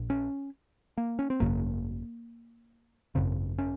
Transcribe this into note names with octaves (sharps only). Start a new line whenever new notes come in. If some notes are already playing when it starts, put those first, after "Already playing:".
Already playing: A#1 A#2
C#4
A#3
C#4
C4
G#1 F#2 C#3 A#3
G#1 F#2 C#3 C4
C#4